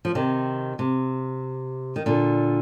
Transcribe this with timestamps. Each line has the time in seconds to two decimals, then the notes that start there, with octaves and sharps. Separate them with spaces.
0.05 F3
0.15 C3 D#3
0.79 C3
1.96 D#3
2.06 A#2 D3